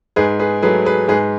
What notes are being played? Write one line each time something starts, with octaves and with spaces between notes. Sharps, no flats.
G#2 G#4 B4
G#4 B4
F#3 A3 G#4 B4
G#4 B4
G#2 G#4 B4